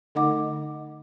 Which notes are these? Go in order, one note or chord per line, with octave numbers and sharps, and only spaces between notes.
D3 A3 D#4 D#5 F#5 D6